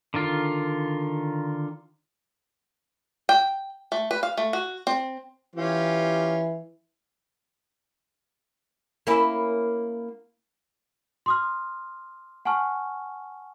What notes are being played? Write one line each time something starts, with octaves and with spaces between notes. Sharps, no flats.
D3 D#3 F4
G5
A3
B4
F5
A3
F#4
C4
E3 C#4 F4 G4
A#3 C#4 E4
C6 D#6 F6
F#5 G#5 A5 C#6 F6